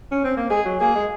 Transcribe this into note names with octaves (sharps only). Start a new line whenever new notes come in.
C#4
C4
A#3
G#3 G#4
F#3
A#3 G#4
G#3